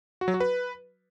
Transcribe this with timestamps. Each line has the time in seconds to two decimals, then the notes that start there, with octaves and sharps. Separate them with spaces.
0.21 F#4
0.28 F#3
0.34 F#4
0.40 B4